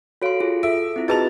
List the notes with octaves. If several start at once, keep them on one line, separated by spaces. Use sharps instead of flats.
F#4 A4 C#5 F5 C6 D7
F4 G#4
A4 E5 D7
C4 E4 F4
D#4 F#4 G#4 B4 A5 A6 F7